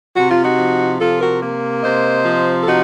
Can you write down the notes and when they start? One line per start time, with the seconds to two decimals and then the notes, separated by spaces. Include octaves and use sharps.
0.16 C3 F#4
0.30 F4
0.44 D#4 F#4
0.59 F3
1.00 C3 F4 A4
1.21 F#4 A#4
1.43 A#3
1.83 C3 C5 D#5
2.25 F3
2.63 A4
2.67 C3 D#4 F#4